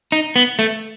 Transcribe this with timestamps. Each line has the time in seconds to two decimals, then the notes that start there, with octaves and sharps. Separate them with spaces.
0.12 D#4
0.36 B3
0.59 A3